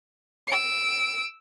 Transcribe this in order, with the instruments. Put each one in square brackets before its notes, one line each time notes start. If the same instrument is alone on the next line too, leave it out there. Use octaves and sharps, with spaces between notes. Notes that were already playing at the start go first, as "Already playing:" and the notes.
[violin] E6 D7